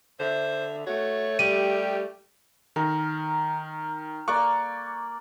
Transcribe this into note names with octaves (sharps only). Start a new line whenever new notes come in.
D3 C5 E5
A3 F#4 C#5
G3 G4 D#7
D#3 A#4
A#3 D5 C#6 D6 F#6